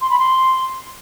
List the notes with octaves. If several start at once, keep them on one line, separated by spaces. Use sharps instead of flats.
C6
B5
C6